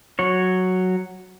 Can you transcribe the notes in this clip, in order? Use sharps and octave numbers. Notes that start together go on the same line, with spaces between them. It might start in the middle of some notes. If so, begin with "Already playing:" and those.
F#3 C#5